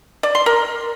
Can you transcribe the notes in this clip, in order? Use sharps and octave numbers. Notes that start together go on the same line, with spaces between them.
D5
C6
A#4